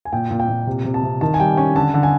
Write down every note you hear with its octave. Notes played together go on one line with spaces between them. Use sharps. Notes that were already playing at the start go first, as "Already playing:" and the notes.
G#5
A#2 G5
A#2
G5
A#2
C3
C3
A5
C3
D#3 A5
G#5
G3 G5
C#4 G#5
D3 A5
D3
G#5